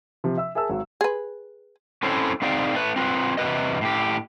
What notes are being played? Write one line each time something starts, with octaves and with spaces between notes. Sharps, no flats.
C3 F3
E5 E6
G#4 A#4 E5 A5 E6
G#1 F#3
G#4 B4
C4 C#4 E4 A4 C5 C#5
C4 D#4 G#4 D5 F5 G5
A3 B4
C4 F4 B4
E2 C3 B4 D#5
A2 G4